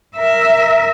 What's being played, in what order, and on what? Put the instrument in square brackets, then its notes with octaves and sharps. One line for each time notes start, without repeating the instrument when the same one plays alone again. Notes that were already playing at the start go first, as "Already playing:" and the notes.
[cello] A#4 E5